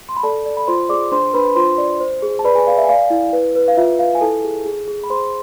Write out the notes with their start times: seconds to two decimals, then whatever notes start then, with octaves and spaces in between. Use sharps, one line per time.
0.09 C6
0.16 B5
0.23 A4 D5 A5
0.46 D5
0.57 B5
0.68 F4 C5 C6
0.89 G#4 D5 D6
1.12 D4 C5 C6
1.34 D4 B4 B5
1.45 B5
1.56 F4 C5 C6
1.78 D5
2.01 C5
2.22 G#4
2.39 A5
2.44 B4 D5 B5
2.55 G#4 G#5
2.67 D5 F5
2.78 E5
2.84 G#5
2.89 D5 F5
3.10 E4
3.33 B4
3.55 B4
3.68 F5
3.77 F4 E5
3.99 B4 F5
4.15 G#5
4.21 E4 A4 A5
4.44 G#4
4.66 G#4
4.88 G#4
5.04 B5
5.10 G#4 C5 C6